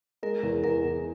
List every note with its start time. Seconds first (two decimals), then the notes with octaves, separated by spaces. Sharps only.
0.23 G#3 A#4
0.43 E2
0.64 E2 A#4
0.84 E2